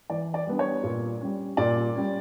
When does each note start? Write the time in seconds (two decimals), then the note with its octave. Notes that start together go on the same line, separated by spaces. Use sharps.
0.10 E3 D5
0.34 D5
0.47 G3 B3 D4
0.59 C#5
0.84 A#2
1.21 G3 C#4
1.57 A#2 D5
1.95 G3 C#4